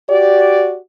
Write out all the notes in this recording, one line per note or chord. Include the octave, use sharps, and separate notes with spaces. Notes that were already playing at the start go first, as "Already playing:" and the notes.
F#4 G4 D5